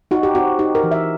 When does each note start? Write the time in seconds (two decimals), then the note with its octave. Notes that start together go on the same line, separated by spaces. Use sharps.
0.11 D#4 F#4
0.23 G4
0.35 C4 F#4
0.59 D#4 G4
0.75 A#4
0.83 E3
0.91 E5